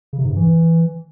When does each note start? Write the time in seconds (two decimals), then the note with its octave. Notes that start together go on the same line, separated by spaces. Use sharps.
0.13 C#3
0.19 C3
0.25 G#2
0.30 G2
0.36 E3